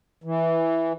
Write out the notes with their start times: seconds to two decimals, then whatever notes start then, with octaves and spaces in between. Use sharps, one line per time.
0.24 E3